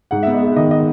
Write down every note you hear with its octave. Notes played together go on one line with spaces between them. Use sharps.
G#2 F#5
B3 E5
D#5
G#3 E5
D#3 D#5
D#5